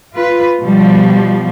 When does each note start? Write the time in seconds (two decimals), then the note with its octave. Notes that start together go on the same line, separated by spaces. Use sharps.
0.13 F4 B4
0.63 B2 F3 G3